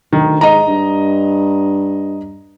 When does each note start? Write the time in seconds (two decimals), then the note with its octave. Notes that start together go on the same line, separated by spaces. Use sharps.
0.13 D2 D#3
0.41 G#2 D#5 A#5
0.68 G2